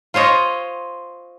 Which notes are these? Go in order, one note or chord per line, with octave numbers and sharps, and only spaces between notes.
F4 C5 C#5 D#5